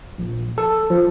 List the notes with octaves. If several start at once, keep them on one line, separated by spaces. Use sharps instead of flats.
A#1
A4
F3